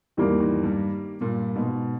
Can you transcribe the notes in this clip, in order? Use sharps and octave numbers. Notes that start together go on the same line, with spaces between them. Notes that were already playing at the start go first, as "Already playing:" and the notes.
E2 G#2 D#3 G3 A#3
E2 G#2
G2
G2 A#2
G#2 B2